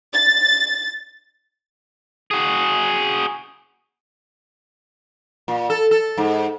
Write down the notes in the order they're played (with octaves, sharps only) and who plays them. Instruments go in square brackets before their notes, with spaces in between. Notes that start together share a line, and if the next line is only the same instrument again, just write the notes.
[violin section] A6
[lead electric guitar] F#4 G#4
[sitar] A#2
A4
A4
G#2